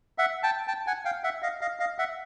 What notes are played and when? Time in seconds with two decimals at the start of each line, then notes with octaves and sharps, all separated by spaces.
0.18 E5 F#5
0.43 G5 A5
0.67 G5 A5
0.87 F#5 G#5
1.05 F5 G5
1.24 E5 F#5
1.42 D#5 F5
1.61 D#5 F5
1.79 D#5 F5
1.99 E5 F#5